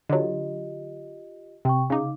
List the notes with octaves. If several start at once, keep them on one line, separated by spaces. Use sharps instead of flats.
D3 F#3 F4 G4 D#5
C3 G5 C#6
C#3 D#4 F5 D6